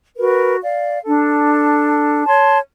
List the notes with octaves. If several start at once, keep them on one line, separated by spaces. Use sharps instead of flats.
F#4 A#4 B4
D5 F5
D4 A4
C#5 A5 C6